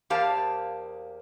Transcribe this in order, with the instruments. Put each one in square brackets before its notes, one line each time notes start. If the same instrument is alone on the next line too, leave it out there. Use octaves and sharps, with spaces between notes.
[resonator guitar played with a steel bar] E2 A#3 G4 C5 F5 A5